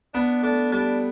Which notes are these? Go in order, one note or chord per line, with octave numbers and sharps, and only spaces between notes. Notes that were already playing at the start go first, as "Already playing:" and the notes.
B3 D4
A3 D4
G3 D4